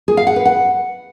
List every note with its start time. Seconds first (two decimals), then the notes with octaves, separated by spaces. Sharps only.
0.08 G#4
0.17 F5
0.27 F#5
0.36 B4
0.45 F#5